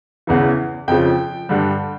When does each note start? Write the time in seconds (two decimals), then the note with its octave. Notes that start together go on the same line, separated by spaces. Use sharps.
0.27 E2 C#3 E3
0.88 F2 C#3 F3 G5
1.49 G2 D3 G3